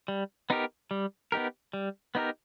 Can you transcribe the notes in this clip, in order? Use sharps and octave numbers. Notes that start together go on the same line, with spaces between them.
G3
B3 D#4 G4 A#4
G3
B3 D#4 G4 A#4
G3
B3 D#4 G4 A#4